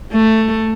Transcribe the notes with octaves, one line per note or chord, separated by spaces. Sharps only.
A3